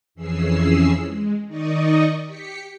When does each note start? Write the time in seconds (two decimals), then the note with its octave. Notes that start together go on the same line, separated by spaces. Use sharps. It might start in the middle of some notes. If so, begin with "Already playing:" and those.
0.15 F2 E3 C#4 G#4 E6 C7
1.05 G#3
1.47 D#3 D#4 D5 D#5 C#6 D#6
2.25 G4 B6 C#7